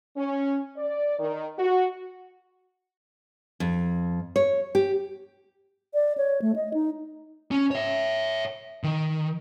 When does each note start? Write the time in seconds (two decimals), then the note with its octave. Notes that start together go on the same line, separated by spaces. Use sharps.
0.17 C#4
0.77 D5
1.19 D#3
1.58 F#4
3.60 F2
4.36 C#5
4.75 G4
5.94 D5
6.18 C#5
6.42 A3
6.56 D#5
6.74 D#4
7.51 C#4
7.71 C#5 E5
8.84 D#3